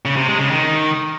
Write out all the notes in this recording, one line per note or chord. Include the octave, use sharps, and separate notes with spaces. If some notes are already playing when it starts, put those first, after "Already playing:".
C#3
C3
G#3
C#3
D#3